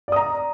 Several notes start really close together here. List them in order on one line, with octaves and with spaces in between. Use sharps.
D5 D#6 A#5